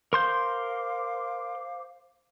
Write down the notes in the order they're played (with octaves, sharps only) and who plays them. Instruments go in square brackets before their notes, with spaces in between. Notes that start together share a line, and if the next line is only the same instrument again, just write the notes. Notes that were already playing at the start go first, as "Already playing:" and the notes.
[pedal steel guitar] A#4 C6 G6 [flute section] C5 F5 D6